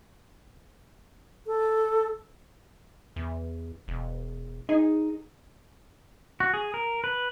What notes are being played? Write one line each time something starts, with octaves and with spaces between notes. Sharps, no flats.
A4
E2
E1
D#4 G#4
F#4
G#4
A#4
B4